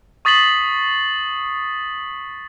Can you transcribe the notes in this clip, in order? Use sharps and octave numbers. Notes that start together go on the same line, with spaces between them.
C#6 D#6 A6 B6 C7 F#7